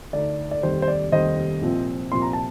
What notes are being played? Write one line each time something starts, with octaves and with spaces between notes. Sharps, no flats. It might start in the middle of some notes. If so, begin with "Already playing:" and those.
D2 D3 A3 D#4 D5
D5
F1 D#2 D#3 G3 C5
C5
D5
F1 D#2 D#3 G3 C5 D#5
C2 A#2 F3 C4
C2 A#2 F3 C4 C6
A#5
A5